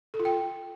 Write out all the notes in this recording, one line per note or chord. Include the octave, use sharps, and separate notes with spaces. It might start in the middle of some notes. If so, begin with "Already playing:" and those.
A4
F4
G5